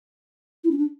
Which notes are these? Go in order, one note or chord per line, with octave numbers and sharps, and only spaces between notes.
E4
C#4
D4